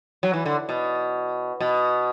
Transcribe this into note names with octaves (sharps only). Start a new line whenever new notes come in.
F#3
E3
D3
B2
B2